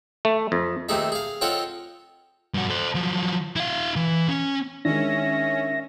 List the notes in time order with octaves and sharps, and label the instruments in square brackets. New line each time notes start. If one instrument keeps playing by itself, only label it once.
[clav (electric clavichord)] A3
F2
[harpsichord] D#2 C3 A3 D#4 G#4 E5
G#4 F5
C4 F4 A4 C#5 D#5 F#5
[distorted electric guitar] G2 F#4
A4 C5
F3 F#3
E4 F5
E3
C#4
[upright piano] D#3 G#3 [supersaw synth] C#4 [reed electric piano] D4 [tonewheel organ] E5 A#6